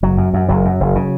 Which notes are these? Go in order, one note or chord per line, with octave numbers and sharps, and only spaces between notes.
F#1 F#3
F#2
F#2
F#1 F#3
F#2
F#1
C#3